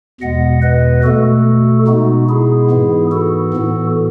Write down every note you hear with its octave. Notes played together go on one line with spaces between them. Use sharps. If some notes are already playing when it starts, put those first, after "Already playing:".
E2 B2 G#3 B3 D#5 F#5
B4 D#5
B2 A3 F#4 A4
B2 G#3 B3 D#4 F#4
E4 G#4
G#2 E3 B3
F#4 A4
A2 E3 B3